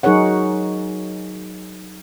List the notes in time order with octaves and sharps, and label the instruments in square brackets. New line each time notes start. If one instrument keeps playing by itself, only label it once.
[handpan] F#3 D#4 G#4 A#4 C#5 F#5